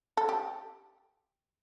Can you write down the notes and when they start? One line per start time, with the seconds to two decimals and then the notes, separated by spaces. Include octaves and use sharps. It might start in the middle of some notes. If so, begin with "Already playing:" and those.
0.17 A4
0.29 G4